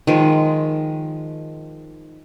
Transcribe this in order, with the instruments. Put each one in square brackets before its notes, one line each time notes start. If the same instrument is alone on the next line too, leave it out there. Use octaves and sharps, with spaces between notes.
[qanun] D#3 F3 G#3